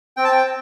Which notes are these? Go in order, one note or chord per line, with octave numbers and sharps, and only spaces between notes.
C4 G5
A5
G5